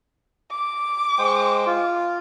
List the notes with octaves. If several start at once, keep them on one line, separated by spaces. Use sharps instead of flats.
D6
G#3 C5 G5
F4